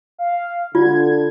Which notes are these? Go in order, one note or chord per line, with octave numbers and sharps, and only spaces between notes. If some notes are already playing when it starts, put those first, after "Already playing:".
F5
D3 F4 G#6